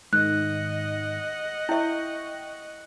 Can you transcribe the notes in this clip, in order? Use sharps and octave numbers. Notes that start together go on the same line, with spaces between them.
G#2 D#3 D#5 F#5 F#6
E4 E5 G5 C#6